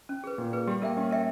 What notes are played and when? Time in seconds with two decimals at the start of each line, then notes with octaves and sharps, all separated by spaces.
0.09 C#4
0.24 G#4 B4
0.38 A#2 C#4
0.53 G#4 B4
0.67 G3 G4
0.82 A#3 A#4 E5 G5
0.97 C#4 G4
1.11 A#4 E5 G5